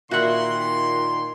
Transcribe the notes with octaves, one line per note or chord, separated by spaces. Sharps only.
A#2 D#3 E4 F#4 E5 F#5 C6